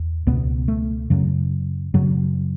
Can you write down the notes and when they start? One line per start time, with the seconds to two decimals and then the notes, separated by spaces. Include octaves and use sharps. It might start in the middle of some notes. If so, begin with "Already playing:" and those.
Already playing: E2
0.27 C#2 B2 B3
0.68 A3
1.10 F#2 C#3 F#3
1.94 F#2 C#3 F#3